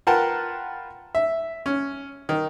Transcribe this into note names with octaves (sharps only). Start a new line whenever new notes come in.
F4 A#4 B4 F#5 G5 A5
E5
C#4
D#3